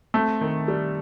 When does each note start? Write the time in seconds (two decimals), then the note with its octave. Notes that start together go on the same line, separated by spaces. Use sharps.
0.14 A3 C4
0.41 D#3
0.68 G3